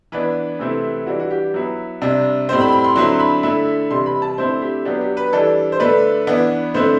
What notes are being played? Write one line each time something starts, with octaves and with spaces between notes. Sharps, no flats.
E3 B3 D4 B4
C3 E3 A3 C4 E4
E3 G3 D4 F#4
F#4
G4
F#3 B3 E4
C3 G3 D4
A2 G3 C4 C5
B5
B5
C6
D3 F#3 C4 E4 C6
B5
D3 A3 E4
C3 E3 G3 C6
B5
A5
D3 A3 C4 E4 C5
G4
F#3 B3 D4 G4
G4
B4
E3 G3 D4 A4
C5
D3 A3 D4 B4
E3 B3 D4
D3 A3 C4 E4 C5